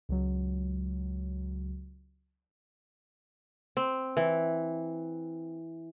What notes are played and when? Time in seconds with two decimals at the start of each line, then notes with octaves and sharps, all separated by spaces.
0.09 C#2 F#3
3.77 C4
4.17 E3